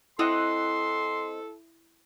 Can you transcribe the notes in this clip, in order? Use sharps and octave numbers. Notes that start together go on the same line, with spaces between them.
C4 E4 A4 D#5 F#5 C6